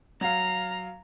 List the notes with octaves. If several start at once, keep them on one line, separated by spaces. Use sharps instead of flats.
F#3 F5 A#5